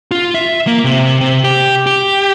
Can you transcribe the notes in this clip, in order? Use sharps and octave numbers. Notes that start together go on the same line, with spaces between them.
F4
E5
A#3
C3
C3
G4
G4